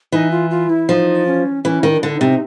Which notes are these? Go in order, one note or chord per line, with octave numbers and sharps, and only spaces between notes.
E3 D#4
F4
F4
E4
F3 D#4
C#4
E3 C#4
D#3
D4
D3
D#4
C3